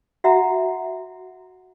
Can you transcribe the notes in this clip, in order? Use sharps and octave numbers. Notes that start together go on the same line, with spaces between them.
F#4 E5 F#5 A#5